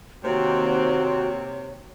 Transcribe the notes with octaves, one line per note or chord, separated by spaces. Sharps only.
C3 D#3 A#3 C4 F#4 C#5